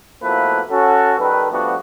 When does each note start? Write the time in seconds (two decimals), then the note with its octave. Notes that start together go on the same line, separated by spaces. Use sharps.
0.23 B2 F3 A3 A#3 E4 B4
0.70 C#4 F#4 A4
1.19 D#3 G3 A4 B4
1.51 F3 G3 A3 B3 D4 F#4